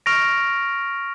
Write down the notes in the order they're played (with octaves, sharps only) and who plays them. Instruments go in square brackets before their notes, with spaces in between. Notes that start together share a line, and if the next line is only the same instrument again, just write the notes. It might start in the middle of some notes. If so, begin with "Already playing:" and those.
[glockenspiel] C#6 F6 A#6 D7 F7